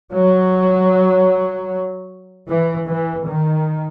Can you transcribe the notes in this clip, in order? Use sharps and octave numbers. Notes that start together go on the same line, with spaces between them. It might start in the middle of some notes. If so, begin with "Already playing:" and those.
F#3
E3
E3
D#3